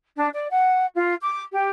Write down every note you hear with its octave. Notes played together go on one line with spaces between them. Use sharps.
D4
D5
F#5
F4
D6
G4